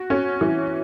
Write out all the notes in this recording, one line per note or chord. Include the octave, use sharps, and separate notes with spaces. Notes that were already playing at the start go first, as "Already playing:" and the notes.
Already playing: F#4
C#4
E3